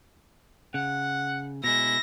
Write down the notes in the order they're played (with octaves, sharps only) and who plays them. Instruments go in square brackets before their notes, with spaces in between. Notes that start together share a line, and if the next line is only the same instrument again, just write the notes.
[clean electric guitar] C#3 [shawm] F#5
[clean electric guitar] B2 G#3 [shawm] E4 [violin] A#6